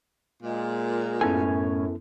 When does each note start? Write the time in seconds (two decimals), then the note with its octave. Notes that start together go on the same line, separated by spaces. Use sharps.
0.43 A#2 G#3
1.21 F#2 A2 B3 C#4 E4 A4 G#5